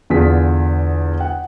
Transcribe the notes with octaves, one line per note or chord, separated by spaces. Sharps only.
E2 D3 F4 G#4 B6
F#5